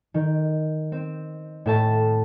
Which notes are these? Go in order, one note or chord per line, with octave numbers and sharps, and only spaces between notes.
D#3
C4
A2 E5 A5